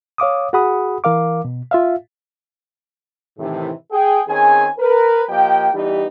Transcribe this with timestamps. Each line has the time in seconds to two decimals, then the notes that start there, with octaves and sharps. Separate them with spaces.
0.18 C#5 F5 D6 D#6
0.53 F#4 G#4 F#5 B5 D#6
1.04 E3 A#4 F5 D6
1.45 B2
1.71 F4 E5 F5
3.39 A2 C3 D#3 E3
3.91 G#4 G5
4.28 D#3 C4 C#4 G#4 G#5
4.79 A#4 B4
5.29 F3 A#3 G4 D#5 G5
5.73 E3 G3 B3 D#4 G4